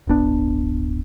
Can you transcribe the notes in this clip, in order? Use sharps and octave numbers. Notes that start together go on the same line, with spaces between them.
D1 G1 B3 D4